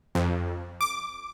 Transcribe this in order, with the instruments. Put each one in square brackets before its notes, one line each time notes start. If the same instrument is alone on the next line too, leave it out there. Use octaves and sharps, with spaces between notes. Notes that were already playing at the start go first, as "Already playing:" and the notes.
[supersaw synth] F2
D6